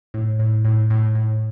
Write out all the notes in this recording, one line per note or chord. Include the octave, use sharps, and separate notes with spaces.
A2
A2
A2
A2
A2